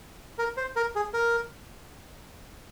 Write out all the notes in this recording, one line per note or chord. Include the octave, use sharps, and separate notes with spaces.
A#4
C5
A#4
G#4
A#4